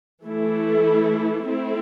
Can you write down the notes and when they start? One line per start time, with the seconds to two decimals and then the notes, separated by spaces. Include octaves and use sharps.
0.25 E3 A3 E4 A4
1.46 A3 C4 E4